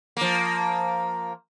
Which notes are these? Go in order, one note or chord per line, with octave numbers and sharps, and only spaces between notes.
F3 A#3